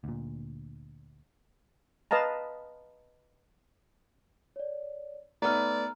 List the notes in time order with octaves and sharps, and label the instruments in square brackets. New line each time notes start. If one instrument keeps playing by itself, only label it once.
[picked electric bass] D2 A#2
[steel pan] B4 D#5 F5 A5 A#5
[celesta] C#5 D5
[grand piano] A3 B3 D#4 [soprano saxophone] D5 [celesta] A#5 F6